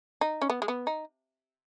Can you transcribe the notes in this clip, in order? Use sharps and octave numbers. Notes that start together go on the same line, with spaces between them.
D#4
C#4
B3
G#3
B3
D#4